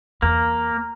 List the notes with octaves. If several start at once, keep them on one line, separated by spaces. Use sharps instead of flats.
E2 A#3 A#5